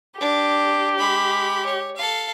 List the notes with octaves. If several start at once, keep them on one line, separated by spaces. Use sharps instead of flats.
D4 G4
G#3 B5
C#5
A4 F5